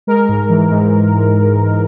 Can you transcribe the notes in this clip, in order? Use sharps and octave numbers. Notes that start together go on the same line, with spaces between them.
G#3 A#4
G#2
E3
G#2